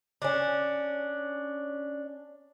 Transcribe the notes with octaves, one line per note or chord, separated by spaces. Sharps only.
C#4 D4